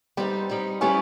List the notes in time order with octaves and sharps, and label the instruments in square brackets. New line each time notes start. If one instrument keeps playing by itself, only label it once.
[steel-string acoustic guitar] G3 B3 D#4 [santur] C4
[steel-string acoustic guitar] G3 B3 D#4
[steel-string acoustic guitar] G3 B3 E4 G4 [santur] C#4